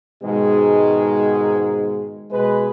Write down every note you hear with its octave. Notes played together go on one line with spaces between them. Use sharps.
G#2 B2 D#3 G#3
B2 G#3 B4